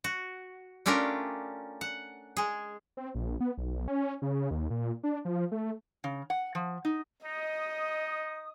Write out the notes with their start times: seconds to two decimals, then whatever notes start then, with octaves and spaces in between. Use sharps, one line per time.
0.04 F#4
0.86 A3 C#4 D4 F4 G4 A#4
1.81 F#5
2.37 G#3 G#4
2.97 C4
3.15 A#1
3.40 B3
3.57 B1
3.88 C#4
4.22 C#3
4.51 D#2
4.70 A#2
5.03 D4
5.25 F3
5.52 A3
6.04 C#3
6.30 F#5
6.55 F3
6.85 D#4
7.25 D#4 D#5 D#6